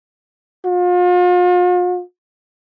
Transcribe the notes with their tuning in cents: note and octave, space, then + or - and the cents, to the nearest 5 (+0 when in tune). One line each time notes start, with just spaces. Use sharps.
F4 +40